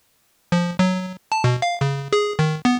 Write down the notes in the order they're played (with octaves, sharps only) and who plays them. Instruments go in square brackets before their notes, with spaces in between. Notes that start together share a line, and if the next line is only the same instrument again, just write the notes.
[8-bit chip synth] F3
F#3
A5
B2
F5
C#3
G#4
D#3
B3